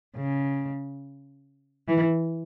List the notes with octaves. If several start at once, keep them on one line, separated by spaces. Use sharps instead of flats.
C#3
E3